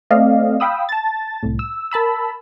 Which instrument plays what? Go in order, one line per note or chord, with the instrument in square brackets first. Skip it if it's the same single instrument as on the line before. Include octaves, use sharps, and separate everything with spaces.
[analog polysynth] A3 C4 D5 D#5 F5
F5 G5 B5 D#6 E6
A5 A6
C2 A2
E6
A#4 A5 B5 E6